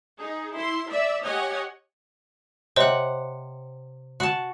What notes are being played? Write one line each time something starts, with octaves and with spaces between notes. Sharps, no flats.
D#4 G#4
E4 C6
D5 E5
G4 C#5 D#5 F#5 G#5
C3 C5 C#5 D#5 F#5
F#4 A5